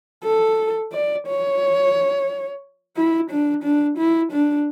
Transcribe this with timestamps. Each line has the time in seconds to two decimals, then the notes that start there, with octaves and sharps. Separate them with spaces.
0.24 A4
0.92 D5
1.27 C#5
2.96 E4
3.30 D4
3.63 D4
3.98 E4
4.32 D4